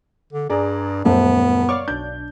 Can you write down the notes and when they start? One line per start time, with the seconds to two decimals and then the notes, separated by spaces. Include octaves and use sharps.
0.33 D3
0.50 G2 G#4 D5 A#5
1.05 D#1 C#2 F#2 A3 B3 C5
1.69 C#5 D5 F5 D6
1.88 B1 D4 G6